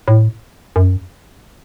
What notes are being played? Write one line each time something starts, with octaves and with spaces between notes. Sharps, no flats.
A2
F#2